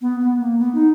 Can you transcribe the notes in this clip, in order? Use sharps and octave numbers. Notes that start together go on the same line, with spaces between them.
B3
B3
A#3
B3
D#4